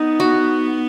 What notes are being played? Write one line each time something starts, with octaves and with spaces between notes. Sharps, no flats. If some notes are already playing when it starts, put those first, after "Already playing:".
Already playing: B3 D#4
F#4